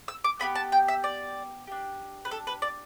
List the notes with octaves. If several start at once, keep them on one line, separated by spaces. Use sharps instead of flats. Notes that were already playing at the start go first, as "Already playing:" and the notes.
E6
D6
B3 E4 G4 B5
A5
G5
E5
D5
D4 G4
B4
A4
B4
D5